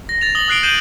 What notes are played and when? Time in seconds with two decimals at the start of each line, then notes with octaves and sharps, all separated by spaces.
0.09 A#6
0.21 A6 F7
0.35 D#6 F#7 G7
0.48 D#6 F#6 C7 D7 G7
0.63 G6 D#7 E7 F#7 G7